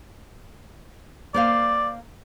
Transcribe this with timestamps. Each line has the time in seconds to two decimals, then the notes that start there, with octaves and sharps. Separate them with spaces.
1.34 A#3 C5 D5 F5